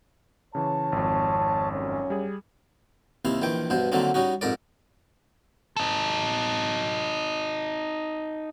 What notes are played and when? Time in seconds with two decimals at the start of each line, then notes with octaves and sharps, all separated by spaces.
0.55 C#3 E3 C#5 A5
0.92 G#1 F2
1.72 F#2 C#4
2.10 G3 G#4
3.25 D#2 C3 E4 F5
3.42 A#1 D#3 E3 G5
3.70 G2 B2 C5
3.92 D3 D#3 F#3 A#3 C4 D4
4.14 G3 C#4 D#4 F#4
4.41 F2 G#2 A#4 D5
5.77 D#4 A4